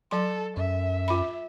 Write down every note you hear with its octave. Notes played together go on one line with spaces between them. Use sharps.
F#3 A4 C6
F#2 E5
F4 B5